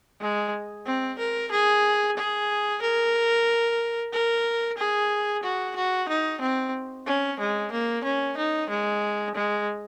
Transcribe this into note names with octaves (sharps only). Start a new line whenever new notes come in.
G#3
C4
A#4
G#4
G#4
A#4
A#4
G#4
F#4
F#4
D#4
C4
C#4
G#3
A#3
C#4
D#4
G#3
G#3